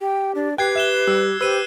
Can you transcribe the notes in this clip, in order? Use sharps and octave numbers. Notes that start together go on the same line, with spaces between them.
G4 G5
D4
G4 B4 G5 F#6 G#6 C7
E5 F#6 E7 G7
G3 E6
G4 B4 C5 E6 D#7